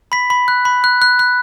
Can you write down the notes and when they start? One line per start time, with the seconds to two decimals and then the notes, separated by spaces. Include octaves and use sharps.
0.12 B5 B6
0.30 B5
0.48 F#6
0.65 B5
0.84 F#6
1.02 F#6
1.19 F#6